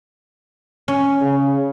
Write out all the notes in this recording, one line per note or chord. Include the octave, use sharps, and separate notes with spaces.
C#4
C#3